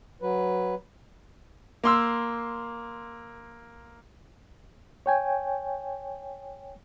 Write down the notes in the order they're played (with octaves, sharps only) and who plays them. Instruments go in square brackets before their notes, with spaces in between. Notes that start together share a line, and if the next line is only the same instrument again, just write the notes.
[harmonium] F#3 B4
[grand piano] A#3 C6 E6
[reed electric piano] C#5 G5 G#5